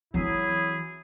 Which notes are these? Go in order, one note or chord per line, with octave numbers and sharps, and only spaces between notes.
E3 F#3 C4 E4 G#4